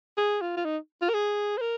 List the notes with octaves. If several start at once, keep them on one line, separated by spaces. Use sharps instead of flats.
G#4
F4
F4
D#4
F4
A#4
G#4
C5
A#4